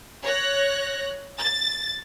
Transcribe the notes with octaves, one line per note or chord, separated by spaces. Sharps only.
C#5 F#6 A#6
A6